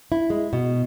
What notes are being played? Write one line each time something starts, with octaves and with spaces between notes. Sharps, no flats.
E4
G#3
B2